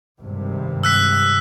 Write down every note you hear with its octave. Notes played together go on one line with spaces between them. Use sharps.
G#1 G2 C3
E6 F#6 B6